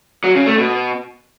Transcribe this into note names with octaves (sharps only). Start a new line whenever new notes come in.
F#3
C#3
A3
B2